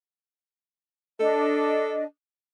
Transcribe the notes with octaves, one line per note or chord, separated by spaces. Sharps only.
D4 A4 D#5